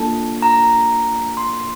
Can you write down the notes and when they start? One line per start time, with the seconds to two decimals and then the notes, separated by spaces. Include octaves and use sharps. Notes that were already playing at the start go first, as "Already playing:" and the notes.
Already playing: A#3 D4 F4 A4 A5
0.42 A#5
1.37 C6